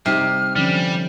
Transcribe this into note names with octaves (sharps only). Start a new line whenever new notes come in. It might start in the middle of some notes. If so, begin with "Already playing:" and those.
C3 G3 D#4 G4 F6
D3 F3 G3 C#4